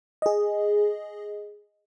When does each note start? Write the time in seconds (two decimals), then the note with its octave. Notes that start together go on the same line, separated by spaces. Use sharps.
0.22 G#4 D#5